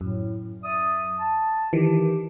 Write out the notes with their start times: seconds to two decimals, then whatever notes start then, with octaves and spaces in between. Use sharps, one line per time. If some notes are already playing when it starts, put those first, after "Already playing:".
0.01 F#2 A2
0.63 D5 E5 D#6
1.19 A5
1.73 D#3 E3 G4